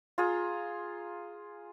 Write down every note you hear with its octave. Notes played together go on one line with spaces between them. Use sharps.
F4 G#4 A#5